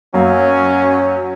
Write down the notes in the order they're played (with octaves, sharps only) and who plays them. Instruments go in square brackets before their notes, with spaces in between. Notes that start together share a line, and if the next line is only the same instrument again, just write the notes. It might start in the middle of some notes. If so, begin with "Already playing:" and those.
[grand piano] F#2 A#3 F5 [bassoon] F#3 [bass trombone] C#4